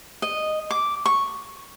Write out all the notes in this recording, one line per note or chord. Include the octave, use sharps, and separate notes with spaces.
D#5
D6
C#6